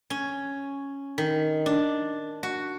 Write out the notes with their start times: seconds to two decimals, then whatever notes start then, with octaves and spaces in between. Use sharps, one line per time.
0.10 C#4
1.18 D#3
1.66 D4
2.43 F#4